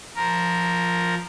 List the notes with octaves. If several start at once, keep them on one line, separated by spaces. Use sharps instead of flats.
F3 A#4